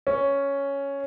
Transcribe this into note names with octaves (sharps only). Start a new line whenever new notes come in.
C#4